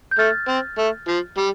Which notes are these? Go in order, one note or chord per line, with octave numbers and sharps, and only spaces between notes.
G6
A3 F6 A6
C4
A3
F3
G3